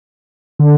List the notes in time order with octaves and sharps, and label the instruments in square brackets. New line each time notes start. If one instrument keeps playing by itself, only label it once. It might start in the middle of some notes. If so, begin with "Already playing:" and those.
[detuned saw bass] D3